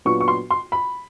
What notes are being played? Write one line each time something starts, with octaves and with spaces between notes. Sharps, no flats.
A#2 F#3 B3 D4 F4 C#6
C#6
C6
C6
B5